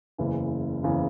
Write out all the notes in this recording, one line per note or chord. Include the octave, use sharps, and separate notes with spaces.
F#1 E2 C#3 E3
F#1 E2 C#3 E3